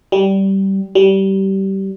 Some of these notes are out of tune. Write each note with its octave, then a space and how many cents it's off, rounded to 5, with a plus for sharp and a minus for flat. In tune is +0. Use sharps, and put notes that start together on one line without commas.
G3 -15
G3 -20